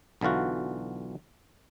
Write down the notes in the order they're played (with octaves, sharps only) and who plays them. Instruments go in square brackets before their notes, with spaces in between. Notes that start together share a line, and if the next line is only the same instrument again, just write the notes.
[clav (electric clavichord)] B1 D3 E3 F4 F#4